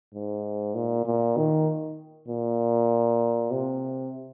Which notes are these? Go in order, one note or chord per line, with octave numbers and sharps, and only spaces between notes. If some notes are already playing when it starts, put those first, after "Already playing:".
G#2
A#2
A#2
D#3
A#2
C3